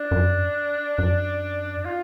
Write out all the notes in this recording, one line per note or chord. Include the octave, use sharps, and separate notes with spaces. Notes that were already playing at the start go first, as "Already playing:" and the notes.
Already playing: D4
F#2
F#2
F4